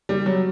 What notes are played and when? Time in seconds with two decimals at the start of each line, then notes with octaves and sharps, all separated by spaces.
0.09 G3
0.26 F#3